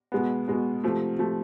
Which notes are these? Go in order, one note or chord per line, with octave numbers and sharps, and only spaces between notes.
B2 G#3 B3
B2 G#3 B3
C3 F3 A3
C3 F3 A3